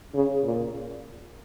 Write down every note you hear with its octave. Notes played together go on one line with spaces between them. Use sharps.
C#3
A#2